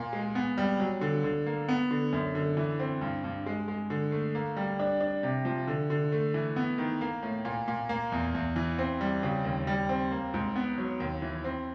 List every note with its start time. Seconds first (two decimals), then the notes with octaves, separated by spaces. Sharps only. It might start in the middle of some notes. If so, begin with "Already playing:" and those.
Already playing: A#2
0.13 G#3
0.35 B3
0.58 G3
0.80 F#3
1.01 D3
1.24 D3
1.46 A#3
1.68 B3
1.91 D3
2.12 F#2
2.35 D3
2.57 E3
2.79 C4
3.01 G2
3.24 G2
3.46 G#3
3.68 G#3
3.90 D3
4.12 A3
4.35 A#3
4.56 G3
4.79 D4
5.01 D4
5.23 C3
5.45 F3
5.67 D3
5.90 D3
6.12 A3
6.34 E3
6.56 B3
6.78 D#3
7.01 A#3
7.23 A2
7.45 A#2
7.68 A#2
7.89 A#3
8.12 E2
8.34 E2
8.56 E3
8.78 C4
9.01 G3
9.23 C#3
9.45 D#2
9.67 G3
9.89 C4
10.12 A#3
10.34 G#2
10.56 B3
10.78 F#3
11.00 D#2
11.22 E3
11.44 C4